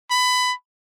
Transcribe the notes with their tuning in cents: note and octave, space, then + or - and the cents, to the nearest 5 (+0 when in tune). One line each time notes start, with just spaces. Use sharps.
B5 +20